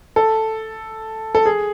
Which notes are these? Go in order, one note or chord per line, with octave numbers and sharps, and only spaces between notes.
A4
A4
G#4